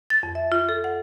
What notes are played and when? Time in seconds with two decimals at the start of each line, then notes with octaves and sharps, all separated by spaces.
0.10 A6
0.23 F2
0.35 E5
0.52 F4
0.69 A4
0.84 F#5